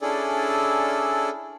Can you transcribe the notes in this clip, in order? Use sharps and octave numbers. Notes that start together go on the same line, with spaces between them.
C#4 D4 E4 G#4 A4 D5